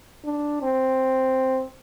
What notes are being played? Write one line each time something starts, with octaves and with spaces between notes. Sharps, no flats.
D4
C4